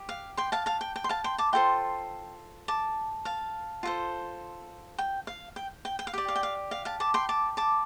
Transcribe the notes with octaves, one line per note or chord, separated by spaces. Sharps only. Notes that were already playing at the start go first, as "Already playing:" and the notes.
Already playing: G4
F5
G5 C6
F5 A5
F5 A5
G5
G5
C6
F5 A5
G5 C6
A5 D6
F4 A4 C5 G5 C6
A5 D6
F5 A5
F4 A4 C5
G5
F5
G5
G5
G5
F5
G4 D5 G5
F5
G5
F5
F5
F5 A5
A5 D6
G5 C6
A5 D6
A5 D6